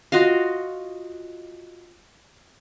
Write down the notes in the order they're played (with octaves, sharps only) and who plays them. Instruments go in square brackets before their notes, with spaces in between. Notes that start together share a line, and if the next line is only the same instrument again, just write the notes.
[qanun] F4 F#4 D#5 F5